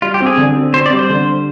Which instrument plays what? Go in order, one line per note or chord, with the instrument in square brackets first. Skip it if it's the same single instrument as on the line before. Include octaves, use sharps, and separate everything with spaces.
[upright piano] G3 [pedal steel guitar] F4
[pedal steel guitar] G4
[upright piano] C4
[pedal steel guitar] G#4
[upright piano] D3
C4
[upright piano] C4 [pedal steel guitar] C5
[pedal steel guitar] D5
[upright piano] G3
[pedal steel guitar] C5
[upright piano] D3